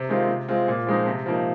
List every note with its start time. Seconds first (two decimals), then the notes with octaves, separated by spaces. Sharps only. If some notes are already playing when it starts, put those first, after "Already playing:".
Already playing: C3
0.09 D#3 G#3 C4 F4
0.28 C3
0.48 G#3 C4 F4
0.68 A#2
0.87 F3 G#3 C4 D#4
1.06 C3
1.26 F3 A#3 D#4